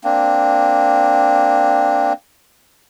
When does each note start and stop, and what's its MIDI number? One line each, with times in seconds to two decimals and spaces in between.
0.04 2.13 58
0.04 2.13 60
0.04 2.13 62